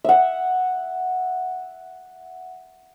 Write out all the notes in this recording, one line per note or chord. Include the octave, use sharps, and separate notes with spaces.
E5 F#5